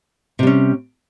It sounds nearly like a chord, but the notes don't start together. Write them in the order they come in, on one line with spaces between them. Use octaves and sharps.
C3 G3 C#4